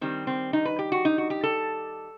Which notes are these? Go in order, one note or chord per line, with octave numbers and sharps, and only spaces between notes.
D#3 G3 C4
C4
D#4
B4
G4
F#4
D#4
F#4
G4
A4